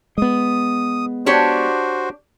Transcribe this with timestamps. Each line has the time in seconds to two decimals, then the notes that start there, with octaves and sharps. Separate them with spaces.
0.18 G#3 B3 D#6
1.26 D4 F#4 G4 C5 C#5